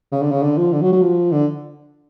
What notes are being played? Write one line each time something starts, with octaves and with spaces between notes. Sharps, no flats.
C#3
D3
C#3
D3
F3
D3
F#3
F#3
F3
D3